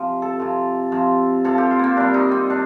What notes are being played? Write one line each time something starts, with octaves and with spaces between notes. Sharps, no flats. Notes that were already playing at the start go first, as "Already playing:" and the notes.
Already playing: C3 F3
A4
C3 F3
C3 F3
C3 F3 A4
G4
F4
A#3 C4
C3 G3 D4
D#4
C4
C3 D4